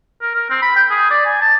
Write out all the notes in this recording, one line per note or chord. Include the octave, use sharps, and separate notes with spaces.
A#4
A#4
C4
B5
G5
G#4
D5
G#5
A5